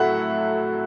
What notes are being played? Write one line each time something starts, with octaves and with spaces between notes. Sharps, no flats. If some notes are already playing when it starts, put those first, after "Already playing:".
Already playing: A2 F#3 A3 E5 F#5